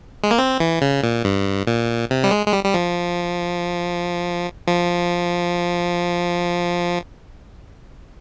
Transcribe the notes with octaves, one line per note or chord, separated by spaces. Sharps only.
G#3
A#3
C4
E3
C#3
A#2
G2
A#2
C3
G3
G#3
G#3
G3
G3
F3
F3